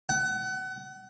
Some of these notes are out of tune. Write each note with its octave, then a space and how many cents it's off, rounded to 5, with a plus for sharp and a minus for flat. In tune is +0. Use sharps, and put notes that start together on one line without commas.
F#5 +30